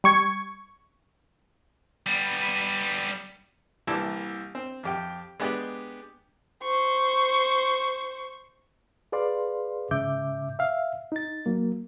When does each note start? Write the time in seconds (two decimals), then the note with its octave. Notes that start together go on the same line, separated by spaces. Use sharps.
0.04 G3 C#6 G#6 C#7
2.06 G3 B3
3.87 C2 A#2 E3 G4 A5 E6
4.55 C4
4.83 F2 G4 G5
5.40 G#3 B3 D4 G4 D5 G5
6.63 C5 C#6
9.12 G#4 B4 D5 F5 C6
9.91 G#2 C#3 E5 D6 G6
10.59 E5 F5
11.12 D#4 A6
11.46 F#3 A#3